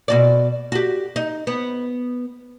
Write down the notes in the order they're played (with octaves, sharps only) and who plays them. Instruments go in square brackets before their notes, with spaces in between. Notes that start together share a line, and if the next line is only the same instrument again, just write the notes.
[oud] B2 F#4 D5
F#4 G4
D#4
B3